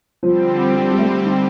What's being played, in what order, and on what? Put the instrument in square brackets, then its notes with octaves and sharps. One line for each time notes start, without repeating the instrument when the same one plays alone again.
[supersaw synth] D3 G3 C4 G4 [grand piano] F3
[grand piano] G3
G3
A3
D#4